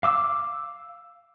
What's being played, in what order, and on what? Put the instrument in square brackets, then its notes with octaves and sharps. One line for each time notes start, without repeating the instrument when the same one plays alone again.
[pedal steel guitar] F5 D6 E6